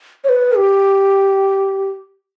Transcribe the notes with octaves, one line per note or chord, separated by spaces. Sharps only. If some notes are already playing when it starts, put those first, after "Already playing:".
C#5
B4
G4